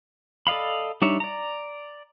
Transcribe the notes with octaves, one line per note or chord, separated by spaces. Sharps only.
A4 D5 D#5 F5 B5
G3 D4 D#4 C#5 E5
D5 A#5